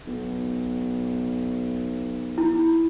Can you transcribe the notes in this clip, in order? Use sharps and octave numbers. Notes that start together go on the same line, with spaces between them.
B1
E4